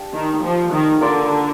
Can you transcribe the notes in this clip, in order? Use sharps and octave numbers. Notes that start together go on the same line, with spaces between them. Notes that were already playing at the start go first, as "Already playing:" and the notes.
Already playing: D4 G4 F5
D#3
F3
D#3
D3 A#3 F4 A#4 D5